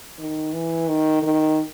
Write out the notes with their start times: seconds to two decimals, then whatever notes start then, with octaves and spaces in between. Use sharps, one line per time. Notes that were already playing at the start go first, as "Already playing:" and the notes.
0.18 D#3
0.53 E3
0.88 D#3
1.22 D#3